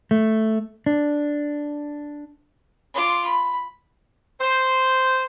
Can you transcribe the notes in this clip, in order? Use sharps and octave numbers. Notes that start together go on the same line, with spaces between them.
A3
D4
F4 D6
B5
C5